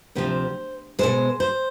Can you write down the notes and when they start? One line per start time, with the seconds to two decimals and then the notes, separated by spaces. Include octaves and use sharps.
0.15 D2 C3 F3 C5
0.99 B2 G#3 C5
1.40 C5